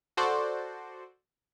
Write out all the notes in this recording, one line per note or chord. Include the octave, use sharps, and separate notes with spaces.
F#4 A4 C5 D5